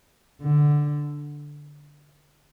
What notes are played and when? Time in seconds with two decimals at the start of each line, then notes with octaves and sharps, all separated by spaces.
0.42 D3